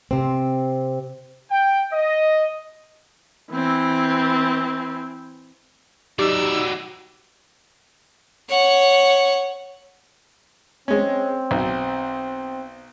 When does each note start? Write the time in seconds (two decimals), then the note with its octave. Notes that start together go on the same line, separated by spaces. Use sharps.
0.11 C3 C4
1.51 G5
1.93 D#5
3.52 E3 C4
6.19 F#3 D#4 G4 D5 E6
8.49 C#5 F#5
10.88 G#3 C4 C#4
11.51 B1